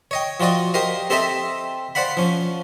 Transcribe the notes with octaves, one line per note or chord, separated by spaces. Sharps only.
C#5 D#5 G5
F3 F4 F#4 D5 D#5
G4 A#4 C5 D#5 F5
C4 G4 A4 C5 D#5 E5
C5 D5 F5 F#5 B5
F3 C#4